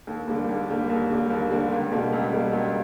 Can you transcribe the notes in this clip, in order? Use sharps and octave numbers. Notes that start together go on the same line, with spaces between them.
D#2
D3 G3 A#3
D#2
D3 G3 A#3
D#2
D3 G3 A#3
D#2
D3 G3 A#3
C#2
B2 G3 A#3
C#2
B2 G3 A#3
C#2